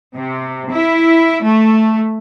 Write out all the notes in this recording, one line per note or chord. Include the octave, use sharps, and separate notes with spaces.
C3
E4
A3